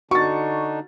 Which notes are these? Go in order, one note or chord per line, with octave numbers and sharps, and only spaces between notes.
D3 D4 D#4 F#4 C#6 A6